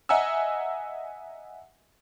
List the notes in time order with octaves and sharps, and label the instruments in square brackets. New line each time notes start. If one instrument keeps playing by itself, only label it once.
[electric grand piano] D#5 E5 F#5 G#5 A#5 E6